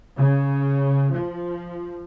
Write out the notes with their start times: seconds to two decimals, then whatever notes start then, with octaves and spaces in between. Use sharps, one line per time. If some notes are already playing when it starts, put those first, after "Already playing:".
0.17 C#3
1.14 F3